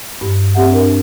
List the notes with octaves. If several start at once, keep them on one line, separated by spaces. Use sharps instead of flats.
G2
C4 G4 E5 F#5
D4 A#4